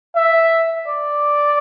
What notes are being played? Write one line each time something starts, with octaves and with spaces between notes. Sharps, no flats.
E5
D5